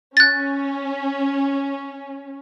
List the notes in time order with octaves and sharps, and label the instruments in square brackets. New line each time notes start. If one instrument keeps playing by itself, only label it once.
[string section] C#4 [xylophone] F#6 A6